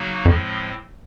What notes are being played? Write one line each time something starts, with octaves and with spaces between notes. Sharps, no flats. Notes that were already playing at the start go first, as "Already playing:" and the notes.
Already playing: C#3 F#3 A#3 D#4 F#4
F2 A2 F3 G#3 C4